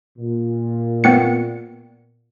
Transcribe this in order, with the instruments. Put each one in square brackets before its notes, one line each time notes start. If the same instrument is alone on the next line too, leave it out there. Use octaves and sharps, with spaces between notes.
[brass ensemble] A#2
[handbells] B3 C4 C#7